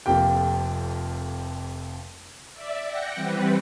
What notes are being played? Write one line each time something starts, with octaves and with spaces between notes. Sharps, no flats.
F1 F2 A#3 G4 G5
D5 E5
F#5 G5 A#6 C#7
E3 G3 C4 B4